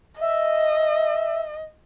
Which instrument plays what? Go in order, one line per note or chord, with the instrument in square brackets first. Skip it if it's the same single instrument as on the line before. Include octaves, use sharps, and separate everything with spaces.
[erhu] D#5 [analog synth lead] E5